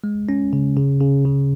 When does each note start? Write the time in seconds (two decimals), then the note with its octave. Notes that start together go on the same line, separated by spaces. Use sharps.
0.04 G#3
0.29 C#4
0.53 C#3
0.77 C#3
1.01 C#3
1.25 C#3